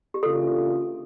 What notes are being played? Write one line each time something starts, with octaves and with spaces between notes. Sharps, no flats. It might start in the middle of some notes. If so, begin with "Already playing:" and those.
G4
C#3 E3 A#3 D4 F4 A4